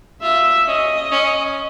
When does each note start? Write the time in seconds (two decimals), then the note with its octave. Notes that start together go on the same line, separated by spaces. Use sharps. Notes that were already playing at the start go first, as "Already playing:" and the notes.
0.22 F4 E5
0.67 C#4 D#5
1.11 C#4